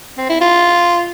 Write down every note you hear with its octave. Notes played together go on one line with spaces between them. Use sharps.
C4
E4
F4